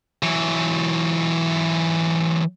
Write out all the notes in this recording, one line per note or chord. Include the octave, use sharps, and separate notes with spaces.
E3 F#3